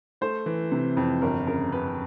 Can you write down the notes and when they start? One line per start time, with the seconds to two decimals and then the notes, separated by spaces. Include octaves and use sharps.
0.21 A3 C5
0.46 E3
0.72 C3
0.97 F2
1.22 G1 A#4
1.47 C#3 A#4
1.72 F#2 B4